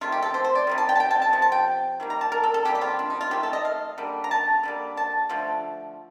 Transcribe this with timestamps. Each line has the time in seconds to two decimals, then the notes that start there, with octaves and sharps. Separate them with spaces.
0.01 C3 D#3 A3 F4
0.12 G4
0.22 A4
0.34 C5
0.44 C5
0.55 D5
0.67 C3 D#3 G3
0.78 A5
0.89 G5
0.96 A5
1.00 G5
1.11 A5
1.22 A5
1.33 C3 F3
1.42 A5
1.52 G5
2.00 D#3 G3 A#3
2.10 A#5
2.21 A5
2.32 A#4
2.44 A4
2.54 A4
2.65 C3 G3 A#3 G4
2.75 G4
2.81 F4
2.99 D4
3.10 D#4
3.21 F4
3.31 D#3 A3 G4
3.43 A4
3.53 D#5
3.65 F5
3.98 D3 G3 A#3
4.24 A#5
4.31 A5
4.63 D3 G3 A#3
4.97 A5
5.29 D3 F3 A3